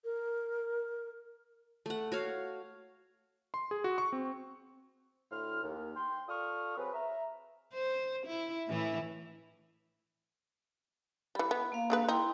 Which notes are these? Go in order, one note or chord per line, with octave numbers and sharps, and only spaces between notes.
A#4
A3 F#5
F#4 C#5 F5
C6
G#4
F#4
C#6
C4
D2 A2 C6 F6
D#2
G5 C6
F4 A4 D5 C#6 D#6 F6
F#3 C4 G#4 B4
E5 A#5
C5
E4
A2 E3 E4
E3 G3 B5
B3
A#3 F5
D3 G#3 B4
D#4 E4 G5 C6